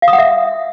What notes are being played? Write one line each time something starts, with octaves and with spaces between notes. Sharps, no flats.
F5
D#6
F#5
E5